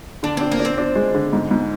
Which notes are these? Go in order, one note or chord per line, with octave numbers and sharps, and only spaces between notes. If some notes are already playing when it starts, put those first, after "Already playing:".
D3 D4
C4 D4
A#3
D4
C4
D4
G#3
D3
G#2
G#2